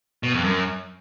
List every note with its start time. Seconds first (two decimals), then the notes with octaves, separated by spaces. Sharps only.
0.23 B2
0.34 F2
0.44 F#2